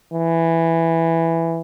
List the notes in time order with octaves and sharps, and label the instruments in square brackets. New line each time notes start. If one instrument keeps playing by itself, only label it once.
[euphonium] E3